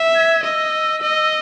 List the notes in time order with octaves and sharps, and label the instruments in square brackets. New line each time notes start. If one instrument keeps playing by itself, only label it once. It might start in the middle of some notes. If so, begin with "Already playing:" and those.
Already playing: [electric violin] E5
[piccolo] G#6
[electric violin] D#5 [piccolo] E6
[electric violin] D#5